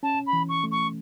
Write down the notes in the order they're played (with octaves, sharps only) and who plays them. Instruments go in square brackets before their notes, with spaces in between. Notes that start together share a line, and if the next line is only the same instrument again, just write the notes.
[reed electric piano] C#4 [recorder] A5
[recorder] B5
[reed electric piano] E3
[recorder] C#6
[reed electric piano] A3
[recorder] C#6